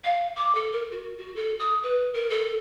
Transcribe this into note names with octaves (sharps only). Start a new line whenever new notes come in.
F5
D6
A4
A#4
F#4
F#4
A4
D#6
B4
A#4
A4